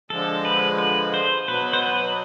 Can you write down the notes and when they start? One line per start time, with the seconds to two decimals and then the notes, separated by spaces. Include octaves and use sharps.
0.10 D3 F3 G#3 A4
0.45 B4
0.78 B4
1.14 C5
1.47 B2 F#3 B3 B4
1.73 C5
1.82 B4